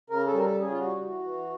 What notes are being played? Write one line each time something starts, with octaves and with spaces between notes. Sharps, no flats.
C#3 A#4
A4
G3 A#4
A4
C#3 G#4
F4
G3 F#4
E3
E3